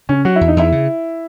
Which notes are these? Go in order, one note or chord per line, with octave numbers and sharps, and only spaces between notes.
C#3 C#4
F#3 F#4
E4
E2
D#4
E2 E4
C#3